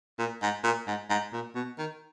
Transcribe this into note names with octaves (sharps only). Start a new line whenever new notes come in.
A#2
G#2
A#2
G#2
G#2
A#2
B2
D#3